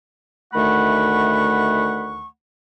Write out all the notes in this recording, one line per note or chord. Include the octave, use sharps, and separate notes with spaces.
D2 D#3 A3 F#5 B5 C#6